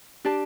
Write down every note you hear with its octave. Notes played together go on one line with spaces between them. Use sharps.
D4 G4 D5 A5